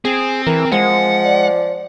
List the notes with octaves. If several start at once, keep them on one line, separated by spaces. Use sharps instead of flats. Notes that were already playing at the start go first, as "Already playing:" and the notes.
C4 G#4
E3 A#4
F3 G#3 F#5
D5